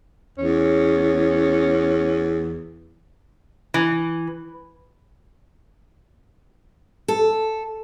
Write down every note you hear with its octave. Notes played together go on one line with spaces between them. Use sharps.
E2 C#4
E3
A4